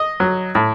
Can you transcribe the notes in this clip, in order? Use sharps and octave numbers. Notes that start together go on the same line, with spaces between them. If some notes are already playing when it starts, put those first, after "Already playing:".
Already playing: D#5
F#3
A2